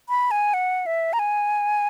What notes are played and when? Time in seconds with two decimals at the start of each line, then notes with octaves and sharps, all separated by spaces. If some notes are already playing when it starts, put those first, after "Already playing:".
0.09 B5
0.31 G#5
0.54 F#5
0.86 E5
1.13 A#5
1.19 G#5